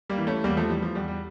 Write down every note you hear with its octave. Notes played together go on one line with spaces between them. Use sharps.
G3 A#3
E3
A3 C#4
E2 G3 A#3
F3 A3
E3 G3
F3
E2 G3
G3